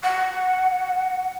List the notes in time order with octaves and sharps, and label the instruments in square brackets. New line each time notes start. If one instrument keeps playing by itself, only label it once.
[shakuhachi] F#5